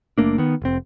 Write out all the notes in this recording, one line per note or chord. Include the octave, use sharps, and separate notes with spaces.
F#1 A3 A#3 D4
D#3 B3
F1 C4